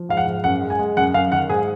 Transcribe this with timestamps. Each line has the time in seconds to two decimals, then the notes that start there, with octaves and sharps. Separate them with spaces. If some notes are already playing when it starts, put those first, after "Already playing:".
Already playing: F3
0.09 G#2 F5
0.17 F#5
0.27 G#2
0.44 F#2 F#5
0.61 G#3
0.70 G#5
0.79 G#3
0.97 F#2 F#5
1.14 F#2 F5
1.31 D#3 F#5
1.49 G#2 G#4